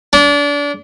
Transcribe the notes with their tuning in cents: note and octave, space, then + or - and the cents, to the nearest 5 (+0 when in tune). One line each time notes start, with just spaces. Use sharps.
D4 -30